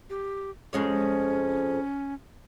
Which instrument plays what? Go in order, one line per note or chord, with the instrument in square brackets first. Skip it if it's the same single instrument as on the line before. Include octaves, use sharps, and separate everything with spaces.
[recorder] G4
[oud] F2 G#3 C#5 [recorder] C#4